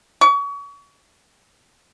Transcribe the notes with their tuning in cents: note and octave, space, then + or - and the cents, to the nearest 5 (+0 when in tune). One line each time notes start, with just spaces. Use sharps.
C#6 +35